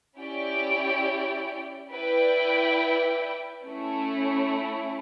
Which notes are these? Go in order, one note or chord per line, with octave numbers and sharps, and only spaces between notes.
C#4 E4 G4 D5 G5
E4 B4 D5 G5
A3 C#4 E4